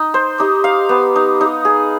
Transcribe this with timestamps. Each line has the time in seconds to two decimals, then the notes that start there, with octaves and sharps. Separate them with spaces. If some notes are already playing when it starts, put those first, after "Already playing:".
Already playing: D#4
0.14 C5
0.39 D#4 G4
0.64 F5
0.89 B3
1.16 D#4
1.41 D#4
1.65 G#4